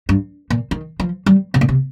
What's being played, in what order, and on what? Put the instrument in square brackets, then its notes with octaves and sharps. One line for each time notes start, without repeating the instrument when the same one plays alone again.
[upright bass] G2
A#2
D#3
F3
G3
C3
A#2
C3